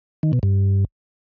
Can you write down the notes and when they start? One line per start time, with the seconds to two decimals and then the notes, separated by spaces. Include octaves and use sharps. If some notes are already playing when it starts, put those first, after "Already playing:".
0.23 D#3
0.33 B2
0.43 G2